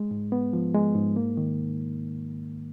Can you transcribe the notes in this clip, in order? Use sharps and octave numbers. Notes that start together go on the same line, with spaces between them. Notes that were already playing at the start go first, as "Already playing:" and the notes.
Already playing: G#3
G#2
B3
F3
G#3
G#2
A#3
D#3